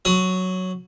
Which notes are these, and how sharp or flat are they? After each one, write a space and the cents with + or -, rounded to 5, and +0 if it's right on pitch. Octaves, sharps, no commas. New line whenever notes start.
F#3 +0 D#6 +35